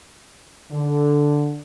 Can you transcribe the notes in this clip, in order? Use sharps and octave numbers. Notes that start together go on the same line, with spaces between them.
D3